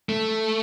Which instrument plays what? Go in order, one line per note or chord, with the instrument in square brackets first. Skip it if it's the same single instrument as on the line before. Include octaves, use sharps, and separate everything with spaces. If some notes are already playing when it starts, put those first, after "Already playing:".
[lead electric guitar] A3